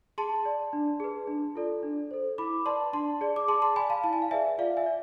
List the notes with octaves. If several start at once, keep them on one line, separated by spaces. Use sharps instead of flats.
G#4 A5 C6
D5
D4
G#4 B4
D4
F4 A4 D5
D4
A4 C5
E4 B5 D6
B4 D5 A5 C6
D4 A5 C6
G#4 D5
D6
G#4 A5 C6
A5 C6
D5 G#5 B5
F5 A5
E4 A5
G#5
F5
G#4 B4 D5 E5 G#5
F4 D5 F5
E5 G#5
D5